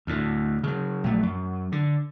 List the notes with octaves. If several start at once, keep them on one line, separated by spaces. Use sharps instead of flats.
D2 A2
C#3 F#3
A#1 F#3 A3
F#2
D3